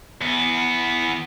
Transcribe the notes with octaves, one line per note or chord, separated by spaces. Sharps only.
E2 B3